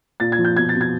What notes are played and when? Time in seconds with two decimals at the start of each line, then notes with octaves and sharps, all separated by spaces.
0.20 A#2 A6
0.32 G#6
0.38 F3
0.45 G6
0.56 B2 G#6
0.69 A6
0.75 B2
0.81 G#6